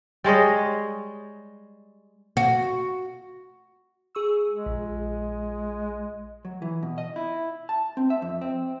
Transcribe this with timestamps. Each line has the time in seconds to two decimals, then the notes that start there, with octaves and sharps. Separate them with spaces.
0.24 G3 G#3 C#5 D#5
2.37 F#4
4.15 G#4 C#6 E6
4.50 G#3
4.66 A#1
6.45 F#3
6.62 E3
6.83 B2
6.98 D#5
7.16 E4
7.69 A5
7.97 C4
8.10 E5
8.22 F2
8.41 C4